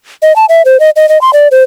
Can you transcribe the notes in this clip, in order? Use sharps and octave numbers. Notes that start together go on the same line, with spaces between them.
D#5
A5
E5
C5
D#5
D#5
D#5
C6
D5
C5